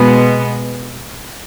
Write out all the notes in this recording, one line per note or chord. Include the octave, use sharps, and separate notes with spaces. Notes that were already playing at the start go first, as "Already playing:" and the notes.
Already playing: B2 G#3 B3